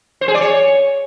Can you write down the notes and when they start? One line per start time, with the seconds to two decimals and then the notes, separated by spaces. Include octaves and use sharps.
0.21 C5
0.28 G#4
0.34 D5
0.41 C#5